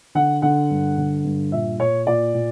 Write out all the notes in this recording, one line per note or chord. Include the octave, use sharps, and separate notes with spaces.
D3 F#5
D3 F#5
G2
D3
G2
A#2 E5
A#2 C#5
A#2 D5
A#2